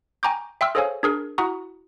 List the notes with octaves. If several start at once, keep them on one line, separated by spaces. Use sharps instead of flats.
G5 G#5 A#5 C#6 D6 G6
E5 G5 C6 E6 F6
G#4 A4 C5 C#5 F5 G#5
D4 G#4 A#4
E4 F#4 F#5 A#5 C#6 D#6